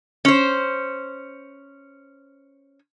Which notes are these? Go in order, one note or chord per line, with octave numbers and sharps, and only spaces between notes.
C#4 C5